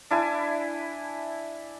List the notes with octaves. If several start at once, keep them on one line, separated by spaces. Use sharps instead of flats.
D4 E4 G#5